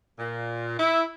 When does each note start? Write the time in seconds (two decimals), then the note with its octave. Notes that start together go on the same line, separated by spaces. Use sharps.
0.19 A#2
0.79 E4